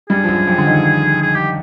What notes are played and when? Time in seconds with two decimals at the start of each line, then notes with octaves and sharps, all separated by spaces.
0.10 G2 G3 G#4
0.24 F3
0.28 F#2 F#3
0.47 F2 F3
0.58 D3
0.66 D#3
1.22 G#4
1.35 G4